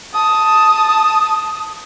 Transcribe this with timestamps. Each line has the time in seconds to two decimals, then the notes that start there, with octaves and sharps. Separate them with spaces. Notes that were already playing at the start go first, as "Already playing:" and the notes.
0.14 A5 D#6